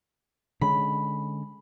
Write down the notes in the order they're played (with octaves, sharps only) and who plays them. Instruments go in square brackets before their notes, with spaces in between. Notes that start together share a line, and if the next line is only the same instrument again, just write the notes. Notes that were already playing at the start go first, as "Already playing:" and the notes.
[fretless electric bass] D3 G#3 C#4 [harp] B5